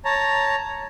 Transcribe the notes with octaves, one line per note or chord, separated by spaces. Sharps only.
C#5 A5 A#5